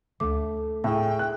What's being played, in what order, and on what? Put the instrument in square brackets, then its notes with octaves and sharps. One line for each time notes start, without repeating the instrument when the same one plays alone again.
[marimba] D2 D6 [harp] A3
[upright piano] A2 [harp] G#4 E5 [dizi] G5 [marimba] A5
[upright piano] F#6